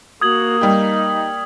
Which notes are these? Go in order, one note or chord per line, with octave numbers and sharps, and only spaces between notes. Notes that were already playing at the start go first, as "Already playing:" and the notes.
A#3 F#4 D#6 G#6 F#7
G3 D#4 G4